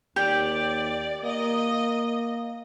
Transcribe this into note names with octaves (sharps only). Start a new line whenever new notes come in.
D#2 G4 D5
A#3 D#5